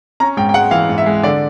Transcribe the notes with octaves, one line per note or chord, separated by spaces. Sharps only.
C#4 A#5
G#2 G5
G5
G#3 F#5
E3 F5
G#2
E5
G#3
D3 D5